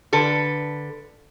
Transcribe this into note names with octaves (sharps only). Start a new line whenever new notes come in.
D3 A4 B4